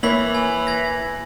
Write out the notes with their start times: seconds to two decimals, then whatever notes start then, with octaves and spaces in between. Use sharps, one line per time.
0.03 E3 A#3 C#5 B5 G#6 F#7
0.34 G#5
0.67 G#6 A#6